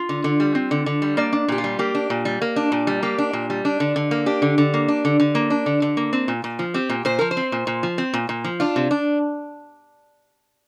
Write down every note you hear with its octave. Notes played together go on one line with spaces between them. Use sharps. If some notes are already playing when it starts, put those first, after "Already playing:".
Already playing: F4
D3
D3
G3
C4
D3
D3
G3
A#3 D5
D4
A#2 G4
F4
G3
A#3 G4
D4
A#2
G3
A#3
D4
A#2
G3
A#3 G4
D4
A#2
G3
D4
D3
D3
A#3
D4 G4
D3
D3
A#3
D4
D3
D3
A#3
D4
D3
D3
A#3
C4
A#2
A#2
F3
C4 G4
A#2
A#2 C5
F3 A#4
C5
C4
A#2
A#2
F3
C4
A#2
A#2
F3
D4 F4
C3
D4